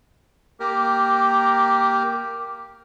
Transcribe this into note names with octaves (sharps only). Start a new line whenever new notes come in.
A#3 G4 A#4